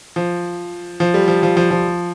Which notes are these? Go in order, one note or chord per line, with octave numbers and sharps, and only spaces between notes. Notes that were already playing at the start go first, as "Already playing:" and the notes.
F3
F3
G3
F3
F3
F3
F3